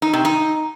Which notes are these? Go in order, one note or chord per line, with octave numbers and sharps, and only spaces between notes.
D#4
C3
D#4